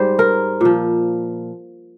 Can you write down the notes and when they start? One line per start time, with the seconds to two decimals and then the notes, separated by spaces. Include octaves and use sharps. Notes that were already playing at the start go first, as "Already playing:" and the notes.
Already playing: G#2 G3 C5
0.19 A#4
0.61 A#2 F3